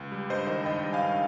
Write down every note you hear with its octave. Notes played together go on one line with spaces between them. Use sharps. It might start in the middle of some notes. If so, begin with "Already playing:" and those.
Already playing: C#2
G3
G2 C5 D#5
D#3 C5 D#5
G2 D#5 G5
G3
F5 G#5
G2